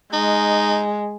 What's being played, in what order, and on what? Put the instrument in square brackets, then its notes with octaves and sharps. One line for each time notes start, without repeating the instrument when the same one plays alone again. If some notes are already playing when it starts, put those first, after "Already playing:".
[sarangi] G#3 [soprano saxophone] D#4